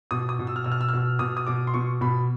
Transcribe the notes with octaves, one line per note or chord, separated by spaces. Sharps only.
B2 D#6
D#6
B2
E6
F6
B2 E6
F6
E6
F6
B2 E6
B2 D#6
D#6
B2 D6
C6
B2 C#6
B2 B5